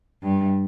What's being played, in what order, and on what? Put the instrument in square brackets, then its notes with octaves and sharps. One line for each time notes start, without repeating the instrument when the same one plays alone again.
[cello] G2